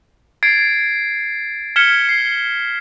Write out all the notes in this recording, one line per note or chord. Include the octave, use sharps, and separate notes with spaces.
G#6 A6 C7 D7
F6 G#6 B6 C#7 E7 G7
C7